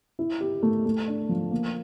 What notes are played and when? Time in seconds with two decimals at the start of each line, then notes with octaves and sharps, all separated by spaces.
0.19 E4
0.40 G4
0.63 A3
0.85 A3
1.08 D4
1.29 F3
1.51 A#3